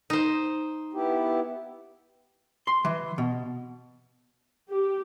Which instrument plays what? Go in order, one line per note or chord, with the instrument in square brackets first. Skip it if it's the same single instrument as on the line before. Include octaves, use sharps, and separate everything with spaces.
[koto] D#4 C5
[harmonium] B3 E4 G4
[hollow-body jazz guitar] C6
E3
B2
[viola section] G4